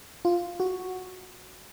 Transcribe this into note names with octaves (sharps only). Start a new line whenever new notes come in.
F4
F#4